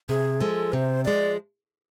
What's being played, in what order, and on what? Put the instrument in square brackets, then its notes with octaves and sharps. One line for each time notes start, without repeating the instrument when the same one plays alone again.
[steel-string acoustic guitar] C3 [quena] G#4
[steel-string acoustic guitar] F3 G#3 [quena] A4
[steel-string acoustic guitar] C3 [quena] C5
[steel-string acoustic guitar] F3 G#3 [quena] D5